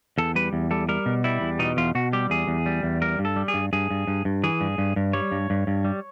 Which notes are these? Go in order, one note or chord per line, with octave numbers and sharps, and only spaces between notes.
E2 A4
G3 B4
E2
G3 A4
G3 A#4
B2
G3 E4
E2
B2 D#4
E2 F4
B2 F#4
G3 G4
E2 G#4
E2
G3
E2
G3 A#4
G2
A4
G3
G#4
G2
G2 G#4
G2
G2
G2
E3 G#4
G2
G2
G2
G3 C#5
G2
G2
G2
G3